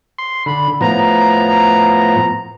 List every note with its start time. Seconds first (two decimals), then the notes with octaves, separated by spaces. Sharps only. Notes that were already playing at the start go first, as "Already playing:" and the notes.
0.19 C6
0.46 D3 B5
0.81 A2 F3 B3 A#5